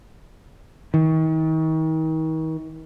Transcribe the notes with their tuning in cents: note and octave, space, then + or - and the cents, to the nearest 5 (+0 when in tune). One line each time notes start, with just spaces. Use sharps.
D#3 +40